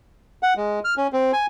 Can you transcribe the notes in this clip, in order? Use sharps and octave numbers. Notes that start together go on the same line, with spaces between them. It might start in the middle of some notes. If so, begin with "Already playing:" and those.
F#5
G#3
F6
C#4
C4
G#5